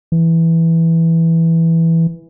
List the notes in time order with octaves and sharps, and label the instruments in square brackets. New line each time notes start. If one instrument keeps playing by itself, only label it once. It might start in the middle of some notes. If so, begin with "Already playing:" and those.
[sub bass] E3